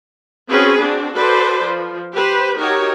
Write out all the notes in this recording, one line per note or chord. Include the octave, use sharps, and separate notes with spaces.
C4 C#4 F#4 G#4 B4
C4 D4 F#4
F#4 A4 B4 C5 D5
F3
G4 B4 C5
D#4 F#4 G4 A#4 C#5